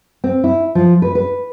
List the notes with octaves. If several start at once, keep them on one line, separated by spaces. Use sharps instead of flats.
C4
E4
F3
B4
B4